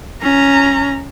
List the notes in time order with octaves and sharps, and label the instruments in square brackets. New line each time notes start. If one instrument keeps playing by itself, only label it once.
[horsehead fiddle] C#4 A#5